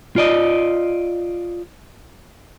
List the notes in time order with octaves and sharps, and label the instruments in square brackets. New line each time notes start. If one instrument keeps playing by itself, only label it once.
[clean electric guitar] F4 D5 D#5